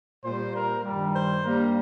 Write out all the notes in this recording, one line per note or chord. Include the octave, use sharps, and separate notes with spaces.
A#2 G3 A#3 C5
A#4
G2 D#3 G3
C5
G2 G3 A#3 A#4